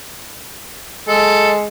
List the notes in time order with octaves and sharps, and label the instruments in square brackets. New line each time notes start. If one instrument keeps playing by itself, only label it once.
[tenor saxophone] G#3 [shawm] A4